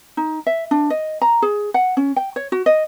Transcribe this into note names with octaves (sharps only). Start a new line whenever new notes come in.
D#4
E5
D4
D#5
A#5
G#4
F#5
C#4
G5
C#5
F#4
D#5